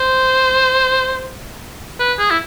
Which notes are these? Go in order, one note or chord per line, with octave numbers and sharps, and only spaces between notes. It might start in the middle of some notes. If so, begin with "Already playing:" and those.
Already playing: C5
B4
G#4
E4